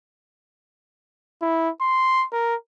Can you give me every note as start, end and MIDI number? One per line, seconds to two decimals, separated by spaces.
1.42 1.70 64
1.81 2.25 84
2.32 2.55 70